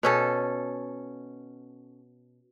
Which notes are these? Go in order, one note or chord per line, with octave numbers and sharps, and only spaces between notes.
B2 C#4 A4